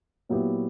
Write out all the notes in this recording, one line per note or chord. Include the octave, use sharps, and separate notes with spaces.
A#2 F#3 B3 E4 G4